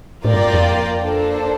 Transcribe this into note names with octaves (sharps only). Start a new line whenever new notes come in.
A2 A#3 F4 A#4 D5 G5
G2
F2
A#3 D4 A4 C5